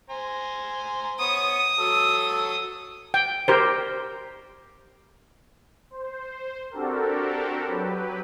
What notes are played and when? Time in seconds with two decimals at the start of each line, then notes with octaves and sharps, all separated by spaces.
0.10 C5 G#5 A#5
1.20 B3 C#5 D#6
1.79 F#3 A4 E6
3.14 G5
3.48 G4 A#4 C5
5.91 C5
6.70 C4 D4 F#4 G4 A4 A#4
7.66 F#3 G4 B4